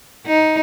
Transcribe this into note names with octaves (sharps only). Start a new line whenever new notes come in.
D#4